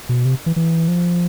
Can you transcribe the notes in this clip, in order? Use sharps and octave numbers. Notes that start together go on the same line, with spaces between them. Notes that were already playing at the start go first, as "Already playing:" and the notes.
B2
C3
E3
E3
F3